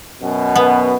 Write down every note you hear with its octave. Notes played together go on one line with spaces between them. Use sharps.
F#2 B2
B3